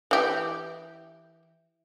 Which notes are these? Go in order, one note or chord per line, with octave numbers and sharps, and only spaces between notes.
E3 G4